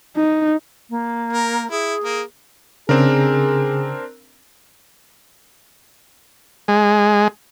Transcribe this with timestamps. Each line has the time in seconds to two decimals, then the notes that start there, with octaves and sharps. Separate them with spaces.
0.16 D#4
0.90 A#3
1.33 A#4
1.71 E4 G#4
2.04 A#3
2.89 C#3 C4 D4 G#4 A#4
6.68 G#3